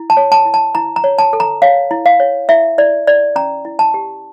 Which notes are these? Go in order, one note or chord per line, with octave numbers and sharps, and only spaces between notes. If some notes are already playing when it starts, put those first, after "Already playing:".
Already playing: E4
A5
C#5
A5
E4
A5
E4 A#5
A#5
C#5
A5
A4
A#5
C#5 F5
E4
F5
C#5
E4 E5
E4 D5
E4 D5
C#4 A#5
E4
A5
G4